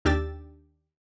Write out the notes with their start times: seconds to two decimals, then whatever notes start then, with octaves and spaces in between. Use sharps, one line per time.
0.05 D#2 D4 G4 E6 A6